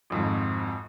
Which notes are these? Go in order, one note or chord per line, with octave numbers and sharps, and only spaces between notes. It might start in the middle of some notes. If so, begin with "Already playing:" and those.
G#1 F2 G#2